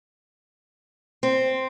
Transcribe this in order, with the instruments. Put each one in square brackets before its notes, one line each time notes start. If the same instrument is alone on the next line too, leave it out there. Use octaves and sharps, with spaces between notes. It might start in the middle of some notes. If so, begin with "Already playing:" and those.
[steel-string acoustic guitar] C4